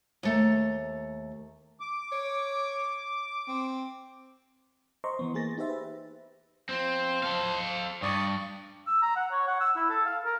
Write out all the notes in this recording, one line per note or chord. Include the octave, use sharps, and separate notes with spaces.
D#2 A3 A#5
D6
C#5
C4
C5 D#5 A#5 C6 C#6
E3 B3
A#3 G#4 A6 A#6
D#4 G4 C5 E5
B4
F3 C4 C5
A4 F5
G2 D5 C#6 D#6
E6
A#5
F#5
C#5
F#5
E6
E4
A4
F5
A#4